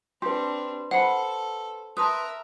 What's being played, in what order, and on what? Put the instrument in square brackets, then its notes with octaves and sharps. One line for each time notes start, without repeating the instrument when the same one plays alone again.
[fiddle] C4 D4 [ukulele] G4 [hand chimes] B4 C6
[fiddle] A4 [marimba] C5 [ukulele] F#5 B5
[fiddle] A#4 E5 [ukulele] B4 [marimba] A5 C6 D#6